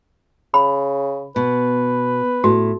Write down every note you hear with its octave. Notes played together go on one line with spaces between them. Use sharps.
C#3 B5
B2 B4
A2 F#4